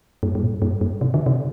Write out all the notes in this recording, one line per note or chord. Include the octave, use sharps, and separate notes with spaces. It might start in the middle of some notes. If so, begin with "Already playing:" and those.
G2
G2
A#2
G2
G2
C3
D3
C3